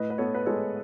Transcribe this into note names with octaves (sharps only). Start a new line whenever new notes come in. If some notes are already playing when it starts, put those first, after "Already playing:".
Already playing: A2 B4 D#5
B4
B3 A4 C#5
B4
G#3 A4 C#5